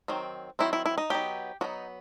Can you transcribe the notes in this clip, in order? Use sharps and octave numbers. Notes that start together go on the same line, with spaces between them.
D#3 F#3 C4
D#3 F#3 C4 E4
E4
E4
D#4
F#3 B3 D#4 G4
F#3 B3 D#4 F#4